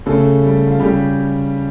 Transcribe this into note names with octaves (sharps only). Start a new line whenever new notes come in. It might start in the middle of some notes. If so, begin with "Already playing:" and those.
C#3 A3 A4
G3
F4
C#3 G3 G4